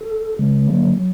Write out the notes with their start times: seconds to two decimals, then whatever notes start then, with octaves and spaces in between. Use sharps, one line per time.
0.01 A4
0.39 C#3 G#3
0.68 D3 F#3 A#3
0.97 F#3